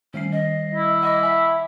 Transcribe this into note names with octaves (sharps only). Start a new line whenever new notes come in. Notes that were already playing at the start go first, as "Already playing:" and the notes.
D#3 G3 C#4 C7
D#5
E4
D#5 F#5 B5 D6
E5 G#5